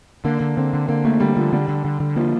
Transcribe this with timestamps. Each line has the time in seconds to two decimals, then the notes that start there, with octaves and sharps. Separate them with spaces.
0.25 D3 A#3
0.41 D3
0.57 D3 C4
0.73 D3
0.88 D3 A#3
1.05 A3 A#3
1.20 D3 G3
1.36 D3 F3
1.53 D3 G3
1.68 D3
1.85 D3
2.00 D3
2.16 F3 A#3